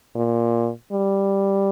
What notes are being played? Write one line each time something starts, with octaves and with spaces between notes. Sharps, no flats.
A#2
G3